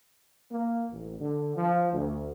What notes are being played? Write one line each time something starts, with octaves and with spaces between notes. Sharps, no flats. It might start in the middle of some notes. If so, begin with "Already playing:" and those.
A#3
A1
D3
F3
D2